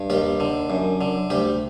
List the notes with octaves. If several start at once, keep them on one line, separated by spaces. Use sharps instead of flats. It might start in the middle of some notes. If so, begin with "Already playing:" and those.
Already playing: G2
D#2 G3 G4
D3
F#2
D3
D2 G3 G4